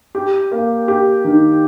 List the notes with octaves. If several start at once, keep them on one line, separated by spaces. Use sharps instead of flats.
G4
A#3
G4
D#3